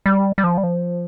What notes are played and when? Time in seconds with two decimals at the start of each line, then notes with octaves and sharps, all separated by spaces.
0.06 G3
0.38 G3
0.44 F3
0.57 G3
0.63 F3